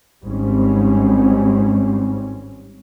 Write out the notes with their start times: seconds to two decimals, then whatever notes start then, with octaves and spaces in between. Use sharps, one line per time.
0.23 G#1 G#2 G3 C4 C#4